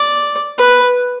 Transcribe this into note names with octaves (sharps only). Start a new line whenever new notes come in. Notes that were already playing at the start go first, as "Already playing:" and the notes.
Already playing: D5
B4